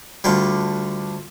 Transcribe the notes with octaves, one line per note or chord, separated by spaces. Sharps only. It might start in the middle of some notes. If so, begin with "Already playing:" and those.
D2 D3 G3 F4